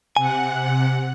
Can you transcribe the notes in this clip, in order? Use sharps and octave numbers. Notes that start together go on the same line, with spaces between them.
C3 F#5 G#5